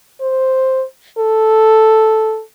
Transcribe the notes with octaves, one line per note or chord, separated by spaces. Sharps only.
C5
A4